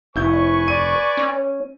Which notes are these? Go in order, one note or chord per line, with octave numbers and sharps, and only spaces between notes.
F1 E4 B4 G#5 C#6 G6
D5 D#7
C#4